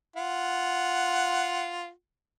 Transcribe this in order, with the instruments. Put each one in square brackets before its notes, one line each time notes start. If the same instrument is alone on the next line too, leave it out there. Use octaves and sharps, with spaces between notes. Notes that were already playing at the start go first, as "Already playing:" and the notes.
[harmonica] F4 F#5